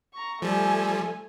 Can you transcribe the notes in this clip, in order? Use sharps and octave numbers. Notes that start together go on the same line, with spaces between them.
A#5 C#6
F3 G3 A3 G#5